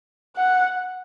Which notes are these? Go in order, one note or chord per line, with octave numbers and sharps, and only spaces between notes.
F#5